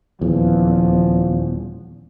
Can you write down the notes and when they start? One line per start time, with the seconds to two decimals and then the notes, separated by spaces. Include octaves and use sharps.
0.21 D#1 E2 F3